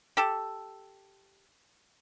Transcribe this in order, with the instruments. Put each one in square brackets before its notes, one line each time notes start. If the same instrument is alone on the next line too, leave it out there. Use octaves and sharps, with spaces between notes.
[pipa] G4 A4